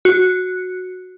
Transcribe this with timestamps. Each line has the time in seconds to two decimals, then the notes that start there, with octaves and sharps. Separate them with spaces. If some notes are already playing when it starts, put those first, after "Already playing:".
0.05 F#4